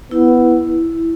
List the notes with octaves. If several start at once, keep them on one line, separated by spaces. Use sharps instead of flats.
B3 E4